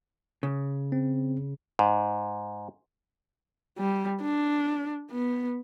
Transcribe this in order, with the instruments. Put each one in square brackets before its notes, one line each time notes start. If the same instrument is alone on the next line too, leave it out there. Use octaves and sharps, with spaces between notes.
[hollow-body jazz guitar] C#3
[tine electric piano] C4
[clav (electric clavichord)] G#2
[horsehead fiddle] G3
D4
B3